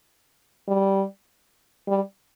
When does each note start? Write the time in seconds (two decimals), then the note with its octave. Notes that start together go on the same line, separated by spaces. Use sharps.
0.68 G3
1.88 G3